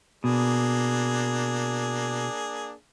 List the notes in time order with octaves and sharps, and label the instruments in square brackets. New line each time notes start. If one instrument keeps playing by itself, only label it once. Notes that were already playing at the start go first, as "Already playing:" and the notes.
[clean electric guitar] B2 [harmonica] A#3 D4 G#4